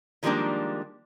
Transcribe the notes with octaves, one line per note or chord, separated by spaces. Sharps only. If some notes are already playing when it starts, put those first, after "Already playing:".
D#3 F3 G3 G#3 A#3 D4